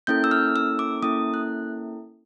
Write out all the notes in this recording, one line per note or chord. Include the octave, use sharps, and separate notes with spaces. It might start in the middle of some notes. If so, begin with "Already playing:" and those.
A#3 C#4 E4 A4 G6
E6
F6
E6
D6
A#3 C#4 E4 A4 D#6
F#6